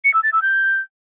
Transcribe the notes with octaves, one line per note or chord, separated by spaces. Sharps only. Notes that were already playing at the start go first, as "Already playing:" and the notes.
C#7
E6
A6
E6
G6